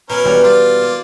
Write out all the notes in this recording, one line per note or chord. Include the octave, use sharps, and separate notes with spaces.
B2 B3 C#4 A#4 B4
B1 E3 G3 C#5
G3 F4 D5
A#3